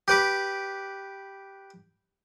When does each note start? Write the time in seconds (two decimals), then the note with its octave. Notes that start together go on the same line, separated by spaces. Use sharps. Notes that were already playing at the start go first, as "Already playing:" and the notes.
0.08 G4 B4 D6